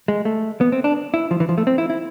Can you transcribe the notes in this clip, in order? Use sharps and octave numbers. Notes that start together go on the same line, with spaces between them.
G#3
A3
B3
C4
D4
E4
F3
E3
F3
A3
C4
E4
E4